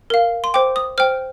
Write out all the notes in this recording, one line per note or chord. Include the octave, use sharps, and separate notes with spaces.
A#4 F5
C6
C5 G5 D6
D#6
C5 G5 F6